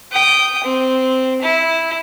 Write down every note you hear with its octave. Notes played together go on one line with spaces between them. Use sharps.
G5 D#6
C4
E4